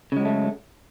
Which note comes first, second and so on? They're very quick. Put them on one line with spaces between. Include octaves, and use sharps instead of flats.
C#3 G#3 F#3 A3